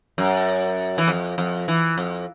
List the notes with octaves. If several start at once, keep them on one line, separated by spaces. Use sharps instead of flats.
F#2
E3
F2
F2
E3
F2